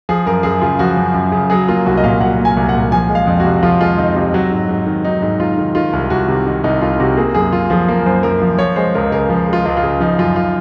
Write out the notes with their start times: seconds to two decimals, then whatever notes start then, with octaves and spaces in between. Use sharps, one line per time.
0.09 F3 G#4
0.26 F#2 A#4
0.43 F#2 G#4
0.61 C#3 F4
0.79 F3 F#4
0.97 F#2
1.14 F#2
1.32 C#3
1.50 F#3 G#4
1.68 A#3 F4
1.86 C2 F#4
1.97 D#5
2.03 A#2 F5
2.21 F#3 F#5
2.39 A#3
2.45 G#5
2.57 C2
2.69 F#5
2.75 A#2
2.92 F3 G#5
3.09 G#3
3.15 F5
3.27 F2
3.40 C3 F#4
3.63 F3 F4
3.81 G#3 F4
3.98 F2 D#4
4.15 C3 F4
4.34 F#3 F#4
4.51 G#2
4.69 G#2
4.86 D#3
5.04 F#3 D#4
5.22 G#2
5.39 G#2 F4
5.58 D#3
5.75 D#3 F4
5.93 C2
6.10 C2 F#4
6.28 C3
6.47 D#3
6.64 C2 D#4
6.82 C2 F4
7.00 C3 F#4
7.17 A#3 G#4
7.35 F#2 G#4
7.52 F#2 F4
7.70 F3 G#4
7.88 A#3 A#4
8.06 F#2 C5
8.23 F#2 A#4
8.42 F3
8.58 F3 C#5
8.76 G#3 C5
8.94 C#2 A#4
9.12 C#3 A#4
9.30 F3
9.48 G#3
9.53 F4
9.65 C#2
9.77 F4
9.83 C#3
10.00 F3 D#4
10.18 F#2 F4
10.36 F4